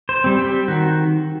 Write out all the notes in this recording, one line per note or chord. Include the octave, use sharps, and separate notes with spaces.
C5
G3 C4
G4
D#3 F#4